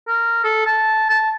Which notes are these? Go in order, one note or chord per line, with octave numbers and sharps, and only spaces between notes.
A#4
A4
A5
A5